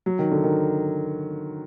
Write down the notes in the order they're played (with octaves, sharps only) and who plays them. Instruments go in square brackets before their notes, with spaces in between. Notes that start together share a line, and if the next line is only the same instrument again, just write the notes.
[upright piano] F#3
D#3
D3
D#3